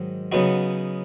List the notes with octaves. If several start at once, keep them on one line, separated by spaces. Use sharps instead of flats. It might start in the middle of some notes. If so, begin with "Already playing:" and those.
Already playing: G#2 D#3 F#3
C#3 F#3 B3 D#4 F#4